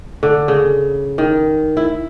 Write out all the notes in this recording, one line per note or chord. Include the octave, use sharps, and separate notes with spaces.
D3
C#3
D#3
E4